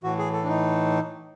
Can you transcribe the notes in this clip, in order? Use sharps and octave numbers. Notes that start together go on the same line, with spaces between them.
A2 E3 F#4
G#4
A4
D4
D#4